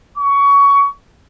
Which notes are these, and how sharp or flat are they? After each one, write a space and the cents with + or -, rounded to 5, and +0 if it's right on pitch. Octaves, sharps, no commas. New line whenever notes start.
C#6 +20